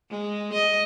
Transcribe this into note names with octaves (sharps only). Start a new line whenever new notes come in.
G#3
D#5